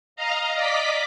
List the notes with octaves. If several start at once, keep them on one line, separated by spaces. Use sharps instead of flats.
D#5 F5 A#5
D5 D#5 D6 B6